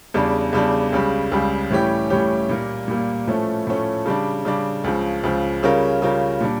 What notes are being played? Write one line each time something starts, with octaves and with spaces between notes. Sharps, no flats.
E2 C#3 G3 D4
E2 C#3 G3 D4
C#2 C#3 G3
C#2 C#3 G3
A2 E3 G3 C#4 G4
A2 E3 G3 C#4 G4
A#2 G3 A#3
A#2 G3 A#3
A2 F3 A3 C#4
A2 F3 A3 C#4
C#3 G3 D4
C#3 G3 D4
C#2 C#3 F3
C#2 C#3 F3
C#3 G3 C#4 F4 A#4
C#3 G3 C#4 F4 A#4
A#2 G3 D4